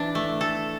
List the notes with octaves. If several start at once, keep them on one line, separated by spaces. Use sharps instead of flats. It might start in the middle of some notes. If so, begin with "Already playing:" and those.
Already playing: E3 D4
A3
A4